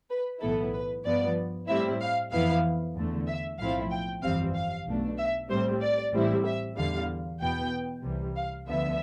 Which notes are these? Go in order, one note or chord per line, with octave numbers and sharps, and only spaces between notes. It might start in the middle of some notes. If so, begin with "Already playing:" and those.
B4
B1 A2 E3 B3 E4 A4
B4
G2 F3 B3 D5
A2 G3 C4 E4 E5
F5
F2 E3 B3 E4 F5
E2 D3 A3
E5
B1 A2 F3 C4 E4 F5
G5
G1 F2 E3 G3 C4 F5
F5
B1 B2 A3 D4
E5
A2 G3 C4 C5
D5
A1 A2 G3 C4 E4
E5
E2 D3 G3 F5
E2 B2 B3 G5
C2 C3 E3 G3
F5
D2 D3 F3 B3 E5